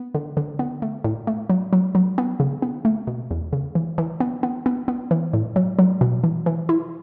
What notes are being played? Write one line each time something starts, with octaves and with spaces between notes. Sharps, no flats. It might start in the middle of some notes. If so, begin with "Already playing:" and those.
Already playing: B3
D3
D3
B3
A3
A2
A3
F#3
F#3
F#3
B3
C#3
B3
A3
B2
E2
C#3
E3
E3
B3
B3
B3
B3
E3
A2
F#3
F#3
B2
E3
E3
E4